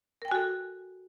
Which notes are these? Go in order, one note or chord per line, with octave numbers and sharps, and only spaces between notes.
F#4 A4 A#4 G5 G#5